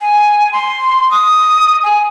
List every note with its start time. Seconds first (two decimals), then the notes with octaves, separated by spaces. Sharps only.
0.01 G#5
0.53 C6
1.11 D#6
1.83 G#5